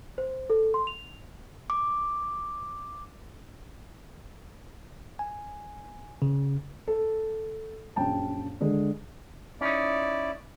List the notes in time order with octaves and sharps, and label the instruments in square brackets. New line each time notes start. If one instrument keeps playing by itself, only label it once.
[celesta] C5
A4
C6
F7
[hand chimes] D6
[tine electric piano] G#5
C#3
[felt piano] A4
A#1 F#2 G5 A5
D3 G#3
[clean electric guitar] C#4 D#4 [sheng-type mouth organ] E4 D5